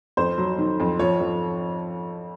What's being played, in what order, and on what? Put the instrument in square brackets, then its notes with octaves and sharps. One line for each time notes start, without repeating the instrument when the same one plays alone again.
[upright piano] F2 C5
F#3
D#3
F2
F3 C#5
F3